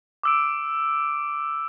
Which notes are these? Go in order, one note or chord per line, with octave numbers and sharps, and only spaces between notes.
D6 E6 D7